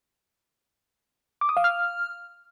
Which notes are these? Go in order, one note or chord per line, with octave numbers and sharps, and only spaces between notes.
D6
D#6
F5
F6